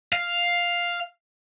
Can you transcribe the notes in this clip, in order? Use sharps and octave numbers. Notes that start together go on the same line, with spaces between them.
F5